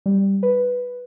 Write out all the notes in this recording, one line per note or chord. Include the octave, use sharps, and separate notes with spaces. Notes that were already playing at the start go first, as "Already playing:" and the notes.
G3
B4